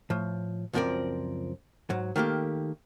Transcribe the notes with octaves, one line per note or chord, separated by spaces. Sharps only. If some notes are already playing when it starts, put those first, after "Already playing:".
A2 F3
C#2 F#2 F3 C4 A#4 D5
G#2 F#3
D#3 A3 A#3 G4